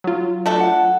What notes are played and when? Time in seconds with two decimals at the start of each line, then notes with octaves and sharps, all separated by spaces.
0.04 F#3 F4
0.46 A3 D4 A4
0.60 F#5